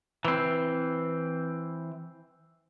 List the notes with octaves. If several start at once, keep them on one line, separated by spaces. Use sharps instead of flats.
E3 C4